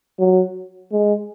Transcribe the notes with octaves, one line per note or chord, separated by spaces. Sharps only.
F#3
G#3